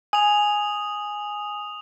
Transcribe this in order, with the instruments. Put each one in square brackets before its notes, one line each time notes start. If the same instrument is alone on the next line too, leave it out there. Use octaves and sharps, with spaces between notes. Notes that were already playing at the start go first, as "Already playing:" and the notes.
[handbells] G#5 [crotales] D#6 F7